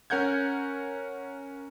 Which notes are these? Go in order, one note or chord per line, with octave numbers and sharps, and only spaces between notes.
C#4 A#4 F#5 G6 G#6